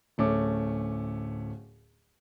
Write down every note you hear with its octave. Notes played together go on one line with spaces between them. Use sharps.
D1 A3 C#4 D6